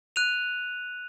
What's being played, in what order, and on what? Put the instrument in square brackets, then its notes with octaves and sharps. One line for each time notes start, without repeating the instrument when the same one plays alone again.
[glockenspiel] F#6 D#7 F7